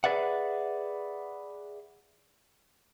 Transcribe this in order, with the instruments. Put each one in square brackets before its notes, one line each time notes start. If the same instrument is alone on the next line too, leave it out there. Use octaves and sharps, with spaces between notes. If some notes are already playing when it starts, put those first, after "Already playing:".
[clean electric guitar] G#4 A4 B4 D5 E5 F#5